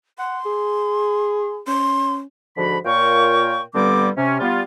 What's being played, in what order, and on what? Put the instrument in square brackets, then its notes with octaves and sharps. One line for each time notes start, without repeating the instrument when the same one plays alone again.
[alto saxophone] F#5 [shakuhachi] C6
[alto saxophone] G#4
[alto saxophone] C#4 [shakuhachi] C6
[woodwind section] G#2 D3 F3 F#4 B5
A#2 F4 A#4 C#5 G5 C#6
G2 D3 G3 B3 C4 D6
C3 C#4
G3 B3 F4